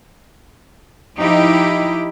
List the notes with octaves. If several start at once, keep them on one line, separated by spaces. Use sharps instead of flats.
F3 D#4 E4 G4